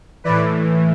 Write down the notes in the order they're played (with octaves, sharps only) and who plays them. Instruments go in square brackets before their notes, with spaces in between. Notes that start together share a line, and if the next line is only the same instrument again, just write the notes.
[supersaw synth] A2 E3 B4 D5